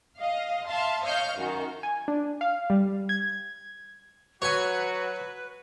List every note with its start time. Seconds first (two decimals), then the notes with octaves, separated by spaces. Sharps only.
0.20 D#5 F5
0.66 E5 F5 A5 C6
1.04 C#5 D#5 F5 F6 G6
1.38 F#2 D#3 F#4
1.83 G#5
2.08 D4
2.41 F5
2.70 G3
3.09 G#6
4.42 F#3 F#4 B4 C#5 G#5